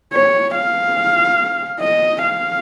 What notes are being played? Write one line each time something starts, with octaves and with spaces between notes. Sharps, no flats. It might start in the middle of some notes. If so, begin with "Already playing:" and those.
C#5
F5
D#5
F5